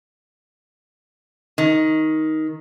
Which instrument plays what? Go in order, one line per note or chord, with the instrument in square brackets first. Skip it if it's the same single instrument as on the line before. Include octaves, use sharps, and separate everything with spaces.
[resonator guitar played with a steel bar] D#3